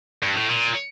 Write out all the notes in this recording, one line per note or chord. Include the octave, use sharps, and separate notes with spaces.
G2
A2
A#2